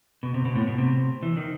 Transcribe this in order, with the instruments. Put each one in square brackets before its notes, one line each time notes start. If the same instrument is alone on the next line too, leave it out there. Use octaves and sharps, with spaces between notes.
[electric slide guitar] B2
C3
B2
A2
B2
C3
E3
D#3